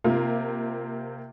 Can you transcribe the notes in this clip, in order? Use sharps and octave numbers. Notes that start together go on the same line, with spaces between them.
C3 A#3 F4